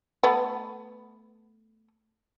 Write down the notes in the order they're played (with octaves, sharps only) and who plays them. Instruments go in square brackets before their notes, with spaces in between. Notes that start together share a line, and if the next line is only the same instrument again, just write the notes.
[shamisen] A3 B3